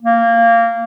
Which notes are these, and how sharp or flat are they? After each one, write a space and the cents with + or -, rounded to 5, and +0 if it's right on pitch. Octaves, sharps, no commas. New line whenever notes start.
A#3 -15